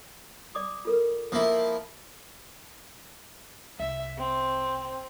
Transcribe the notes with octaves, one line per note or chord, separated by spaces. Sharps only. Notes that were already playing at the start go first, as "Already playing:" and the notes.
D5 D6 D#6
F4 A4 A#4
F3 A#3 E4 D#6
C2 E5
C4